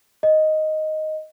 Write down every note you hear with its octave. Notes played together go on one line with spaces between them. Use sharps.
D#5